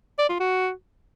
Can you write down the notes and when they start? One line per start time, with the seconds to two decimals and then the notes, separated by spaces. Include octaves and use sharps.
0.19 D5
0.29 F4
0.40 F#4